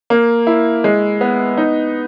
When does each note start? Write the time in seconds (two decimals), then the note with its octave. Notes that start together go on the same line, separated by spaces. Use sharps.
0.10 A#3
0.47 E4
0.84 G#3
1.21 B3
1.57 D#4